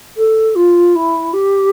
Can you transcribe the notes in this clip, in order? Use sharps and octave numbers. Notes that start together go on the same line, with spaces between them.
A4
F4
E4
G4